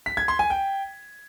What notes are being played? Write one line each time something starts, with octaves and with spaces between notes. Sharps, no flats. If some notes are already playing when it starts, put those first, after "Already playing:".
B6
G#6
C6
G#5
G5